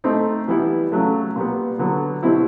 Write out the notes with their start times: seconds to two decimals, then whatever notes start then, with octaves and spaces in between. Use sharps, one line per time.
0.04 A3 C4 D#4
0.48 E3 G3 B3 E4
0.92 C#3 F#3 A3
1.36 A#2 G3 B3
1.79 D3 F#3 B3
2.23 B2 G3 C4 E4